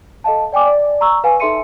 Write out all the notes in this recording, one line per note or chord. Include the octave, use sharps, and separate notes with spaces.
A4 D#5 F5 A5
D5 G5 G#5 D6
D5
A#5 C#6 E6
B4 F5 G#5
D#4 A4 E5 C6 C#7 D#7